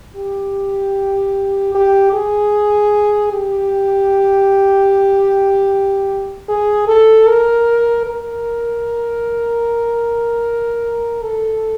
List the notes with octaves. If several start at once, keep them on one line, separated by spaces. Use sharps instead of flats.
G4
G4
G#4
G4
G#4
A4
A#4
A#4
A4